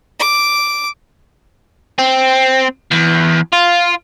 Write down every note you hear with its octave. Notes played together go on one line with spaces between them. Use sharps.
D6
C4
E2
F4